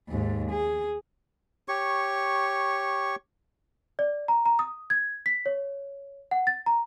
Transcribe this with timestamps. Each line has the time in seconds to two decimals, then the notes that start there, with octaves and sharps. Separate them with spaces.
0.10 D#2 G#2
0.51 G#4
1.68 G4 C#5 C#6
3.99 D5
4.28 A#5
4.46 A#5
4.59 D#6
4.90 G#6
5.26 B6
5.46 C#5
6.31 F#5
6.47 A6
6.66 A#5